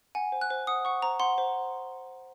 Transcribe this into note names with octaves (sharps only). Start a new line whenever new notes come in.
F#5 G#5
C5
F#6
C5
F#5 D#6
F#5 C#6
C5 A#5
F#5 C6
C5